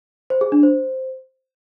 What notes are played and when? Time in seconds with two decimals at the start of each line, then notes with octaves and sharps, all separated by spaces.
0.30 C5
0.41 G#4
0.52 D4
0.63 C5